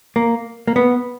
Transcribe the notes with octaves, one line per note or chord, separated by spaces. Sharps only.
A#3
A#3
B3